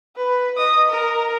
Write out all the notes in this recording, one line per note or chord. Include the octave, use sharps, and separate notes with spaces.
B4
D#5 D#6
A#4